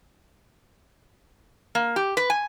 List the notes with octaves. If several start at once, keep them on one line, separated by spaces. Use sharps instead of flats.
A#3
G4
B4
G#5